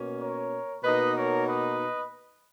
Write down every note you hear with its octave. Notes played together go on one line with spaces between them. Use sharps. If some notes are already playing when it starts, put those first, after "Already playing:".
Already playing: B2 A#3 C#4
A#4 C#5
B2 A#3 D#4 B4 D#5
A#4 C#5
B4 D#5